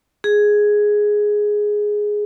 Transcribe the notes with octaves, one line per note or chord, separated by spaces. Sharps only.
G#4